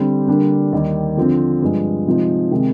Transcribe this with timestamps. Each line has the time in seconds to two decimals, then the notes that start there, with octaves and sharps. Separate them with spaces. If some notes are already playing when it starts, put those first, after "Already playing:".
Already playing: D3 G3 C4 G4
0.27 D3 G3 A#3 D4
0.72 D#2 D#3 G3
1.17 D3 F3 C4
1.62 G2 F3 G#3
2.07 C3 F3 G#3 D#4
2.51 C3 D#3 G#3 D#4